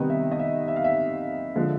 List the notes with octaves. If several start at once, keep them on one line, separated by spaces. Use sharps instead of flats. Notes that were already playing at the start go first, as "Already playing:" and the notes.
Already playing: C3 D#3 G3 B3 D#4 D#5
E5
D#5
E5
E5
F5
E5
D3 F3 G#3